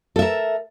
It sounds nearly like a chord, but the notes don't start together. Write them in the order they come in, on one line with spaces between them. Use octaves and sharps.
A4 E5 A#4